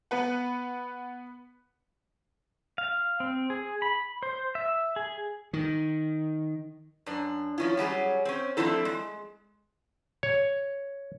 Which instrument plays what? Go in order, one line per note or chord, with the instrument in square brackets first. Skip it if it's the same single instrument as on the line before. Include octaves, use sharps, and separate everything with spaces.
[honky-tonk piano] B3 B4 F#5
[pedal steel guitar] F5
C4
G#4
B5
C5
E5
G#4
[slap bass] D#3
[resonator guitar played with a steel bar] F#2 D4
F3 C#4 E4
F#3 G3 C#4 G#4
C4 C#4
F3 A3 C4 D4 E4 A4
G#3
[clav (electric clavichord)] C#5